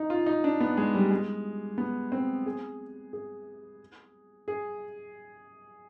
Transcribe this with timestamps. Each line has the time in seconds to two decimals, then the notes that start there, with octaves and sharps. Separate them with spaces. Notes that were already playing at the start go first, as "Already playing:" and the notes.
Already playing: D#4
0.10 F4
0.26 D#4
0.44 D4
0.60 B3
0.77 G#3
0.95 G3
1.11 G#3
1.78 B3
2.12 C4
2.46 G#4
3.13 G#4
4.48 G#4